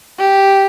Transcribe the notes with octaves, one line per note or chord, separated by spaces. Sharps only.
G4